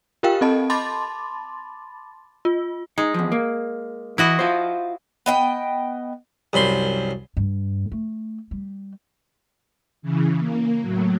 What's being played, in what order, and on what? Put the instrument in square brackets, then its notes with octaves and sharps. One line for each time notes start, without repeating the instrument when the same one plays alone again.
[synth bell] F4 G4 A#4 F5 G5
C4 A4 D#5 A5
A5 B5 C6 D6 A6
F4
[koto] G#3 [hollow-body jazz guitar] D#4
[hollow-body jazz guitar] E2 F3
A#3
[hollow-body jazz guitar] E3 [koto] E4 F#4 D#5
[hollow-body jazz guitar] F4 C5
[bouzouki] B3 D#5 G5
[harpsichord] C2 F#2 B5 C6
[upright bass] G2
A3
G3
[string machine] C#3 E3
A#3
A2 F#3